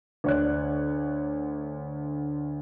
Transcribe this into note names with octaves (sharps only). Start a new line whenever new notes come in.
D2 D3 C#5 D5 F#6